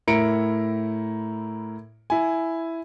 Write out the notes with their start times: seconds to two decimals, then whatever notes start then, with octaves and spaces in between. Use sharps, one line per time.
0.07 A2 E4 A#4 A#5 C#7 D7
2.10 E4 G#5